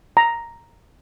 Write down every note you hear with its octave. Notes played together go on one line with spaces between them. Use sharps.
A#5